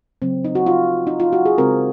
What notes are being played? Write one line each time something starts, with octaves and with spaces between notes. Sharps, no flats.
C#3 F#3 C4
D#4
F#4
F4
D#4
F4
F#4
G#4
C#3 G#3 C4 A#4